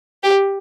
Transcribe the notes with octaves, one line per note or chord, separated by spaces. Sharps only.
G4